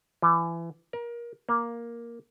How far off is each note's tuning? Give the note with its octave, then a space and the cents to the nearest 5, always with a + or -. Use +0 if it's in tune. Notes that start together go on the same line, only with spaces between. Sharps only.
E3 +25
A#4 +25
A#3 +5